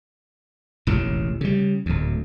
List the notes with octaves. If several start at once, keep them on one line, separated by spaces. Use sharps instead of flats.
E1 A1 D#2 C#3
C#3 G3
D1 D2